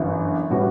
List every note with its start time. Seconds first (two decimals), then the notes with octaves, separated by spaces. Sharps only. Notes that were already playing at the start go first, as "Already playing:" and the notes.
Already playing: G1 F#2 E3
0.50 A2 G3 C#4 F#4 B4